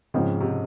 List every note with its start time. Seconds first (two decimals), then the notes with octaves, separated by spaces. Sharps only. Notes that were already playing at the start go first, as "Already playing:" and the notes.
0.14 G#2 C#3 F3 C4
0.41 C3